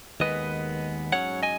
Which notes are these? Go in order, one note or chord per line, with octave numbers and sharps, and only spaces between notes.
D#2 D#3 G#3 B3 B4 D#5
G#2 F#3 C#4 C#5 F#5
D#5 G#5